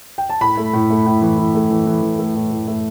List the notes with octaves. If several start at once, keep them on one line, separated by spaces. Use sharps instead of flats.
G5
A5
A2 B5
A3
A2
A3
A2
E3
E3
A3
E3
E3
E3
A3
A2
A2
A3